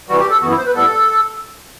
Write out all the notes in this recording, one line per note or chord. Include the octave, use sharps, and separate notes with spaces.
C3 E3 G3 F#4
G4
A4
F#2 E3 B3 F#4
E4
C5
B4
A2 G3 B3 A4